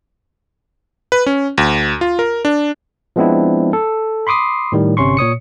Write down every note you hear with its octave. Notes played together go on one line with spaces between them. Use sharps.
B4
C#4
D2
F4
A#4
D4
F3 G#3 B3 C4 D4 E4
A4
B5 C6 D6 D#6 C7
A2 D#3 G3
G1 C3 C#4 C6 C#6
A#2 C#5 D#6 C#7